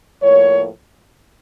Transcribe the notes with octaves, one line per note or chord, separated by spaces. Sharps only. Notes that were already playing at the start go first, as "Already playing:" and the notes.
A2 F3 A#3 C#5